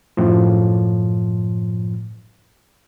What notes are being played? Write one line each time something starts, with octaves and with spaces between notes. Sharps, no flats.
F#2 A2 F3